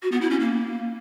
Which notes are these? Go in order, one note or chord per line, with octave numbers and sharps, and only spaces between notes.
F#4
B3
E4
C#4
A#3